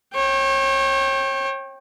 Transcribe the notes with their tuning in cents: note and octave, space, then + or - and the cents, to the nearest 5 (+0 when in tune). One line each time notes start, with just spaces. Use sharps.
C#5 -35 G5 +0